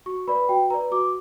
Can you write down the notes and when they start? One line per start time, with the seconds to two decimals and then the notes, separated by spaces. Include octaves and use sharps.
0.06 F#4 C#6
0.28 B4 D5 B5
0.49 F#4 G5
0.70 B4 D5 A#5
0.92 F#4 D6